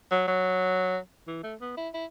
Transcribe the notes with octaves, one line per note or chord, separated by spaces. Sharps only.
F#3
F#3
E3
A3
B3
E4
E4